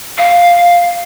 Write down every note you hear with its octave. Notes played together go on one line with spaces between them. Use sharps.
F5